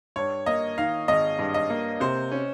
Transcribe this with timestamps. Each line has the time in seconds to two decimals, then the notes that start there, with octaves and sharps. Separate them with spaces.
0.16 G2 C#5
0.46 A#3 D#5
0.77 D#3 F5
1.08 G#1 D#5
1.39 G2
1.54 D#5
1.70 A#3
2.00 C3 C5
2.31 C#4